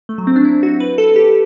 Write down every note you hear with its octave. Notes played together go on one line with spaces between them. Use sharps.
A3
F#3
C4
D4
E4
F#4
B4
A4
G4